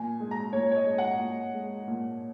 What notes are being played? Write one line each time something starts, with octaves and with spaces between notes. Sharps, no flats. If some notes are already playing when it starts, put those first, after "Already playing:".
Already playing: A#2 G#5
G#3
A#5
A#2 C#5
C#5
D#5
G#3
F#5
A#2
G#3
A#2